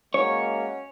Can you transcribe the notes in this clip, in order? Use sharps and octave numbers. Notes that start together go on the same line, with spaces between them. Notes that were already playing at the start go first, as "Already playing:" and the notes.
G#3 A#3 C#4 F#4 C#5